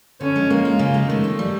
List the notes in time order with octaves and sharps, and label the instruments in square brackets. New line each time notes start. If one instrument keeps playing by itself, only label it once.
[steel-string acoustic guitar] D3 [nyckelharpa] C#4
[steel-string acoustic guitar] G#3
[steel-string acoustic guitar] G#3 [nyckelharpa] A#3
[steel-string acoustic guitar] F4
C#3
G#3
[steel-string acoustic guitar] D#3 [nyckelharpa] A3
[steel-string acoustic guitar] C4
G3